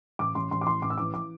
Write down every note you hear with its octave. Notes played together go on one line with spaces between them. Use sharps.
A1 D6
A1 C6
A1 C6
D6
E3 C6
A1 D6
E6
E3 D6
E3 D6